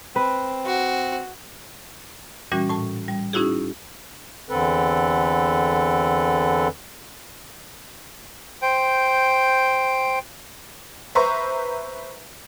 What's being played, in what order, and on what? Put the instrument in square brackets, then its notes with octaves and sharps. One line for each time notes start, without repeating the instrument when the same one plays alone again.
[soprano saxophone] C4 [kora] B4
[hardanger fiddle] F#4
[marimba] A#2 E3 G3 C#4 F#4
A2 A5
G3
C#4 D#4 E4 F#4 G#4
[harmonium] E2 D3 C4 A4 B4
[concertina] C5 G5
[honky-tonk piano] B4 C5 E5 A#5 C#6